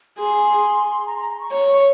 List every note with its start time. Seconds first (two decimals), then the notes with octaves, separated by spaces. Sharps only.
0.19 G#4 C6
1.06 A#5
1.18 A#5
1.40 C#6
1.52 C#5